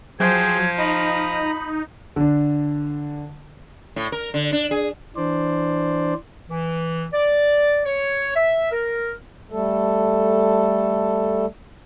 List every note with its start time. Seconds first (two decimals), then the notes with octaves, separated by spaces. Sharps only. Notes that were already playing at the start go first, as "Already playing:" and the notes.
0.20 F3 F#3 G#4 C5 G5 G#6
0.78 D#4 D#5 A#5 B5
2.16 D3 D4
3.96 A2
4.12 A#4
4.34 D3
4.52 D4
4.71 G#4
5.16 E3 D4 C5 D5
6.50 E3
7.13 D5
7.85 C#5
8.36 E5
8.71 A#4
9.51 G3 A3 A4